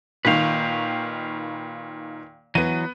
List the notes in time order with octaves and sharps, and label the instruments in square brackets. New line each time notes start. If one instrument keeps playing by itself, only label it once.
[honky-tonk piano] A#2 D#3 [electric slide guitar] B4 F5
[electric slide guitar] E3 F#3 [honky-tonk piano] B3 D#7